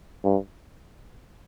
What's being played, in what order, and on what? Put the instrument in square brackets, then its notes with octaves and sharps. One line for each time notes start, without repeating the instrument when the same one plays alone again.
[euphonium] G2